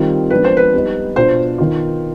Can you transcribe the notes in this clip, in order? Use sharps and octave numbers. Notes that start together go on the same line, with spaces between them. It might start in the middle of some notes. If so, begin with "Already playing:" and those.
Already playing: D#3 G3 C4 F4
F3 G#3 B3 D4 F4 B4
C5
B4
G3 B3 D#4
B2 B3 D4 F4 C5
D#3 B3 F4